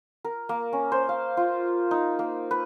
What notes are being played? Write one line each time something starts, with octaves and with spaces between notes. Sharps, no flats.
A#4
A#3
C#4
C5
F5
F4
D#4
A#3
B4